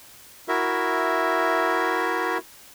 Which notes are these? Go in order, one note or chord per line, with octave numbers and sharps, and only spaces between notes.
E4 F#4 A#4 E5